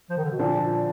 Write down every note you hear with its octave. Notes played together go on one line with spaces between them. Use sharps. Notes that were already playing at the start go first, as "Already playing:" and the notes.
F3
D#3
D3
B2
A#2 D3 F3
A#2